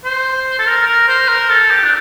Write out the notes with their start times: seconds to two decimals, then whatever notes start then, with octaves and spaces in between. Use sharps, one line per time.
0.05 C5
0.59 A4
0.67 A#4
0.87 A#4
1.08 C5
1.28 A#4
1.50 A4
1.71 G4
1.84 D4